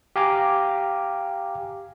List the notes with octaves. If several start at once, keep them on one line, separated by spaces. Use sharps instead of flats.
G4 F5 G#5 A#5 D6